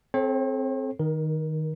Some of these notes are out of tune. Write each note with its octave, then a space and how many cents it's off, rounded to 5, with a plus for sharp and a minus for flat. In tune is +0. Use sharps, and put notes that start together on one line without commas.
C4 +0 A4 -30 C#5 -45
D#3 -5 A#4 +30